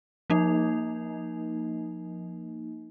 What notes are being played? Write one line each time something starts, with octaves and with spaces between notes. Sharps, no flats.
F3 A#3 D#4